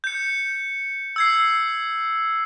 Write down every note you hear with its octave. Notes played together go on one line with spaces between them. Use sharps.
G6 C#7
E6 G#6 C7